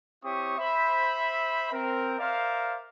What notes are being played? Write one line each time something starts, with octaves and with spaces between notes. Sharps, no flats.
C4 E4 G4 C#5 C#6 D#6
C5 E5 B5
C4 A#4
A#4 C5 D5 E5 F5